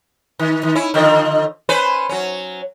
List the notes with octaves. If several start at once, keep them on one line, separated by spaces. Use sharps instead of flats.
D#3
D#3
C#4 E4
D3 D#3 F3
C#4 B4 C5
F#3 C#4